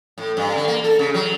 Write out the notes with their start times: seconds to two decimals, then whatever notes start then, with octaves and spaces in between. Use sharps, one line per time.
0.18 A2
0.37 G2
0.56 D3
0.68 A#3
0.84 A4
0.99 C#3
1.14 F#3